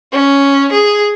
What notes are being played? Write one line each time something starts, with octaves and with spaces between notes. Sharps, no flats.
C#4
G#4